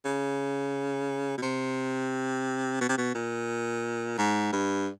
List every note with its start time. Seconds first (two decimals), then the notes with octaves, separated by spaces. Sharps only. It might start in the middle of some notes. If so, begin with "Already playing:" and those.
0.05 C#3
1.37 B2
1.42 C3
2.81 B2
2.89 C3
2.98 B2
3.15 A#2
4.18 G#2
4.52 G2